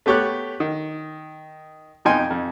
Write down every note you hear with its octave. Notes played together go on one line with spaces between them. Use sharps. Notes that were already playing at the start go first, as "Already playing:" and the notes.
A3 B3 G4 C#5 D6 F#6
D#3
F2 B2 D#4 G5 G#5 C6
F2